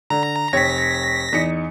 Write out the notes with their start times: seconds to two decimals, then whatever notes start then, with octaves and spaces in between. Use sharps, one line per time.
0.10 D3 A#5
0.53 F1 C#5 G5 A#6 B6
1.33 E2 D#4 C#7